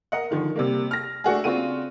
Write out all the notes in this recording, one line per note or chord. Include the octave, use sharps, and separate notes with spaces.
A#4 D#5 F#5
D3 D#3 F3
C3 G3 A#3
F6 A#6
A3 D4 F#4 G#4
C#3 C4 D4 F4 F#4 D#7